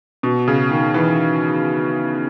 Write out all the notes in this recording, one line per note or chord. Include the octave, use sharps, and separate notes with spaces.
B2
C#3
D#3
E3